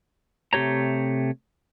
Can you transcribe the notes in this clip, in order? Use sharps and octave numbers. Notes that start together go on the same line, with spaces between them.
C3 A3 G4 C#5 A#5